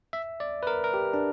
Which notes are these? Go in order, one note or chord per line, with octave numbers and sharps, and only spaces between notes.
E5
D5
B4
A#4
A#4
G4
D4